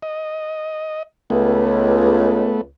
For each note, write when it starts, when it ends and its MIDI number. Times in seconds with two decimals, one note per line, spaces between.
0.02 1.03 75
1.30 2.69 37
1.30 2.61 57
1.30 2.61 59